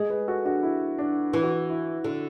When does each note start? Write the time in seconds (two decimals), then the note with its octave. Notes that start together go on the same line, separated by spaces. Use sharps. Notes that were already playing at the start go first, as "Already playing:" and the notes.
Already playing: G#3
0.10 G#4 B4
0.28 F#4 A4
0.45 D4 F#4
0.63 E4
0.99 D4
1.33 E3 E4
1.43 F#4
1.52 E4
1.70 E4
2.04 D3 D4 F#4